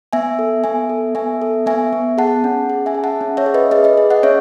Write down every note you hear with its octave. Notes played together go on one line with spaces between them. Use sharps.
B3 E5 G#5
A4
B3 E5 G#5
A4
B3 E5 G#5
A4
B3 E5 G#5
B3
G#4 F#5 A5
C#4
G#4
E5 G#5
G#4
F#5 A5
C#4
C#5 E5
G#4
B4 D#5
G#4 B4 D#5
B4 D#5
G#4
D#5 F#5
C#4 C#5 E5